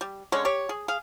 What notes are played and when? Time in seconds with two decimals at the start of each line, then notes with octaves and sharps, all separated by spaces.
0.01 G3
0.32 D3 G#3 C#4 C#5
0.45 G4 C#5
0.69 G#4
0.88 G#4 F5